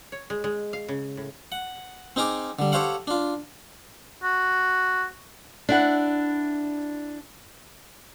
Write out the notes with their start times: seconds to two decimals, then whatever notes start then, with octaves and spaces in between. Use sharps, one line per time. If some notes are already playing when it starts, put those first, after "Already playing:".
0.12 C#5
0.30 G#3
0.44 G#3
0.73 F5
0.89 C#3
1.17 A2
1.52 F#5
2.16 C4 D#4 G#4 A#4 D6
2.59 D3 G3
2.72 G4 A4 C5 C#5 F5 F#5
3.07 D4 F4
4.24 F#4
5.69 D4 E4 F#5